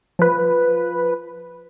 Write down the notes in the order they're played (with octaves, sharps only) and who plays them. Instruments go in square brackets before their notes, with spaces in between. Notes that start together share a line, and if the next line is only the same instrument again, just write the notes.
[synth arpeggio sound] F3 B4